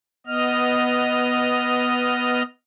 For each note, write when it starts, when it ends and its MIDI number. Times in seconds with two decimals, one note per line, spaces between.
0.27 2.43 59
0.27 2.43 75
0.27 2.43 89